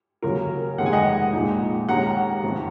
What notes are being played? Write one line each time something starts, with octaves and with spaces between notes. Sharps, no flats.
D#2 C#3 F#3 A#4
F1 D#2 D#3 G#3 F#5
G#5
D#5 F#5
A#1 A#2 G#3 D#4
D#2 D#3 G#3 C#4 F#5 A#5
F1 F2 D#3